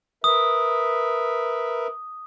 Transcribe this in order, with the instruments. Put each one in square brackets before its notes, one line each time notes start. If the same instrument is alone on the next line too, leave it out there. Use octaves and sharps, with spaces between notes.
[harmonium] A#4 B4 E5 [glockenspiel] D#6